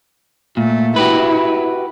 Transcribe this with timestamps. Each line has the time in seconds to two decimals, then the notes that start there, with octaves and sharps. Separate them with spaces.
0.57 A#2 A3
0.96 E4 F#4 G4 B4